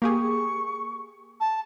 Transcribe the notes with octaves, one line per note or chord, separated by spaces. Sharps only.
A#3 G4 G#4 C#6
A5